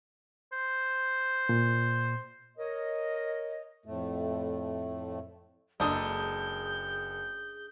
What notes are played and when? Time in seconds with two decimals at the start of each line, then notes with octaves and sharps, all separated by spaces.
0.53 C5
1.49 A#2
2.57 A#4 C#5 D#5
3.86 F2 A2 A3
5.80 F#1 G#3 D4 D#4 G#4 A4 D#6 G6